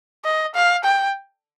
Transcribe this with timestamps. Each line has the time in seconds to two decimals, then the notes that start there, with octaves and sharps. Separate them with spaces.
0.25 D#5
0.55 F5
0.85 G5